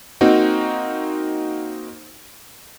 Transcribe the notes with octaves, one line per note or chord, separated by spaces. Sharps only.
A#3 C4 D#4 F#4